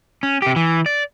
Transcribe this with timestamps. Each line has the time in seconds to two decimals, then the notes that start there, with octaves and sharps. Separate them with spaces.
0.23 C#4
0.42 C3 G4
0.56 E3
0.86 D5